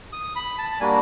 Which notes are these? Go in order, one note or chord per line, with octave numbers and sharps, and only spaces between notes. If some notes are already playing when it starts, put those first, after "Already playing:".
D#6
B5
A5
G3 A#3 D4 F#4 G#5